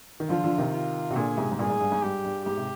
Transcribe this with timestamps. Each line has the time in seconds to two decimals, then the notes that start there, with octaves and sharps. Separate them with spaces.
0.20 D#3
0.29 D3 F3 F4
0.44 D3 F3
0.58 C3 D#3
0.73 F4
1.10 C3
1.15 A#2 D3 G#4
1.37 G#2 C3
1.52 G#2
1.59 G2 A#2 G#4
1.70 G#2
1.80 G2
1.92 G#2
2.02 G2 G4
2.25 G2
2.45 G#2 G4
2.57 C3